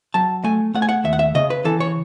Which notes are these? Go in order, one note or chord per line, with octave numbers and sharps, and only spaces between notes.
F#3 A5
A3 G#5
A3 F#5
G#5
F#5
D#2 E5
F#5
E5
C#3 D#5
B4
E3 A4
C#5